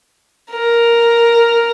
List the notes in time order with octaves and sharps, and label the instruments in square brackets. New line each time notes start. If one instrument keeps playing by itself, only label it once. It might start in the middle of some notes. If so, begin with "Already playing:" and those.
[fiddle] A#4